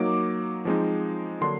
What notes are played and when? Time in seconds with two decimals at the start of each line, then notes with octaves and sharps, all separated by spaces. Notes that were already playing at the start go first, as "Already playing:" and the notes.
Already playing: F#3 A#3 D#4 D6
0.65 F3 G#3 C4 D#4
1.41 D3 F#3 A#3 D4 C6